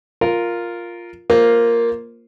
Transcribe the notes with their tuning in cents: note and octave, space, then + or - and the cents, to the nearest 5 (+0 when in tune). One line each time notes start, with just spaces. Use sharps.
F4 +0 A#4 +0
A#3 +0 F4 +0 C5 +0